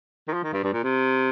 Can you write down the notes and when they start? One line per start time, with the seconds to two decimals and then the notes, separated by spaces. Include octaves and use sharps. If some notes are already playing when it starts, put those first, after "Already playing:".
0.28 D#3
0.33 F3
0.43 D#3
0.53 G2
0.63 G2
0.73 A#2
0.83 C3